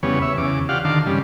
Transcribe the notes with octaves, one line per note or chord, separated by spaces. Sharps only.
E2 C#3 G3 B3 C#5
C#5 E5
E2 C#3 D6
F4 G4 D5 F5 F#5
D3 D#3 F4 A5 C6 D6
G2 C#3 G3